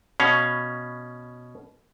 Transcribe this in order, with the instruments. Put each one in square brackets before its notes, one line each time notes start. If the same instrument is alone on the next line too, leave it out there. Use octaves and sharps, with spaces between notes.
[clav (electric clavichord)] B2 C#4 F5